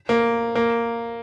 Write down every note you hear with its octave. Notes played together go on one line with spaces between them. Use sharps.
A#3
A#3